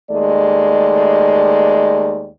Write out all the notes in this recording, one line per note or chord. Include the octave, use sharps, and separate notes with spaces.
D#2 G#3 A3 D5